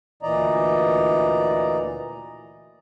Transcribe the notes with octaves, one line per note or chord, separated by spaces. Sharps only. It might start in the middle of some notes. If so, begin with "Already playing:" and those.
D2 A#2 E3 D5 D#5 A#5